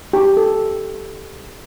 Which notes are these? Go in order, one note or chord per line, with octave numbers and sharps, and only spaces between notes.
G4
A4